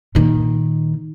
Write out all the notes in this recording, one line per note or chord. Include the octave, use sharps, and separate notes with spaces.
A#2 D#3